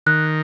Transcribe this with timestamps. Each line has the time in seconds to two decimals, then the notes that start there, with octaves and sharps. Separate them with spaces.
0.07 D#3 F#6